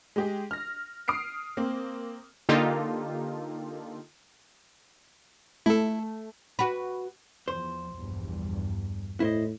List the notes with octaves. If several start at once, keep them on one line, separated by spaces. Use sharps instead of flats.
G#3 G4 G#4
F6 A#6
D#6 F6 C7 D7
A#3 C4
D3 A#3 D#4 F4 G4 A4
A3 E4 A4
F#4 B4
E2 F3 C5
A#1 E2 G2
A2 E4 C5 D#5